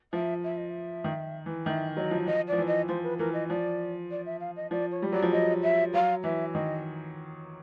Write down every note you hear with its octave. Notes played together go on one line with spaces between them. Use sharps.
F3 E5
E5
D#5
E5
D#3
E3
D#3 E5
F#3 D#5
F3
F3 D#5
F3 D5
E3
D#5
F3 C5
B4
E3 A#4
D#5
F3 D5
D5
E5
F5
D#5
F3 D5
C#5
G3
F#3 D5
F3
F#3 D#5
E5
F#3 F5
E3 E5
D#3 D#5